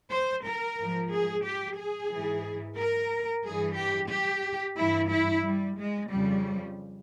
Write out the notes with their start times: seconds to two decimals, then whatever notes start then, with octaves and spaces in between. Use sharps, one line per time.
0.11 C5
0.45 A#4
0.78 G#2 F3
1.11 G#4
1.44 G4
1.77 G#4
2.11 G#2 E3
2.77 A#4
3.44 G2 E3 G#4
3.76 G4
4.10 G4
4.77 G2 E3 E4
5.10 E4
5.43 G3
5.77 G#3
6.09 F2 C#3 F3 G3